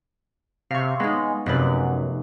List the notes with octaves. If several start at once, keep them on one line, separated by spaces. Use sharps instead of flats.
C3 F5 C#6
G#3 B3 D#4
F1 F#2 A3 B4